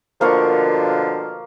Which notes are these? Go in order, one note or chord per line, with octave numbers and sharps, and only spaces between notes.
B2 D3 F3 A#3 F5 C#6